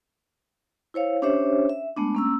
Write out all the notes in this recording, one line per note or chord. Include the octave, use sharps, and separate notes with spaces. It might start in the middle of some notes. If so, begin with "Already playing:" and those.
E4 C5 C#5 F5
C#4 D4 G4 C5 C#5 E5
E5
G#3 A3 B3 D4
A#3 C#4 E6